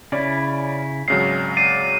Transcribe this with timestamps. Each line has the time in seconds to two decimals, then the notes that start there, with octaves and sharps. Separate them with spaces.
0.12 C#3 C#4 E4 D5
1.08 G#1 C#3 F#3 C7
1.57 D5 C7 D#7